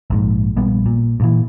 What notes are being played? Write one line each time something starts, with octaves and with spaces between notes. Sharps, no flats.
A#1 G#2
A#1 G3 B3
A#2
G2 A#2 E3